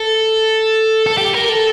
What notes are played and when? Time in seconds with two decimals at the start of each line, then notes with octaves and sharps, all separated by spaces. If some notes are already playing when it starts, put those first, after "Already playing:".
Already playing: A4
1.06 A4
1.18 G4
1.33 A#4
1.49 A4